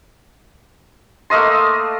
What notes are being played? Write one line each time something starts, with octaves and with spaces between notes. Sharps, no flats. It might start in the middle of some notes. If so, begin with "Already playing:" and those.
A3 A#3 D#5 C6